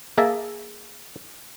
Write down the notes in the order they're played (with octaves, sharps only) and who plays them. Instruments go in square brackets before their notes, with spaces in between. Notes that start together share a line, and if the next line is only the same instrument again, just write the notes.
[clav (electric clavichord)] A#3 G#4 D#5 E5 A5